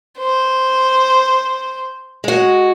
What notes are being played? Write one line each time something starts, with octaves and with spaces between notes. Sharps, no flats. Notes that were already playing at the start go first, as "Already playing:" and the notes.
C5
G#3 F#4